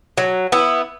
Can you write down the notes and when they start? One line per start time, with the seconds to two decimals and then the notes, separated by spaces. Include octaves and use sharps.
0.17 F#3
0.52 B3 E4